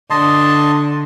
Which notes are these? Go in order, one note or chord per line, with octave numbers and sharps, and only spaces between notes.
D3 D#5 A5 C6